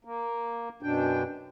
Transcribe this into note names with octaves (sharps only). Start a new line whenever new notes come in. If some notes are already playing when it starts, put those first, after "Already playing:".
A#3
F#2 B2 D4 G5